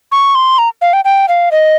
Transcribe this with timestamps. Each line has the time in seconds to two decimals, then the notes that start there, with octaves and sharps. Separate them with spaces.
0.12 C#6
0.35 C6
0.58 A#5
0.81 F5
0.93 G5
1.05 G5
1.28 F5
1.51 D#5